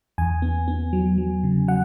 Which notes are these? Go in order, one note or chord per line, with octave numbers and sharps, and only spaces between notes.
E2 G#5
B3
B3
F#3
F#3
C#3
F#3 F#5